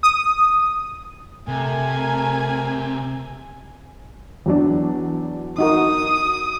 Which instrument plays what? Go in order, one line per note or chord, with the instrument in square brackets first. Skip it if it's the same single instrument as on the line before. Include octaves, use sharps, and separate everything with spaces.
[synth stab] D#6
[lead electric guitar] C3 [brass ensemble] A3 A#4 [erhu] G#5
[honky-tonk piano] E2 F#3 D4
[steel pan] D#4 F#4 A#4 [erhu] D#6